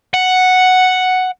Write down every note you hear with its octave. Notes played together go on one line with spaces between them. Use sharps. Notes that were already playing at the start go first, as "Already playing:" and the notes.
F#5